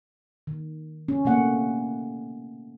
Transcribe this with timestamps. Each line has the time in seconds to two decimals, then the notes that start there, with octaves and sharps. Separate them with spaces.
0.47 D#3
1.08 C#4
1.25 C3 A3 A#3 F#5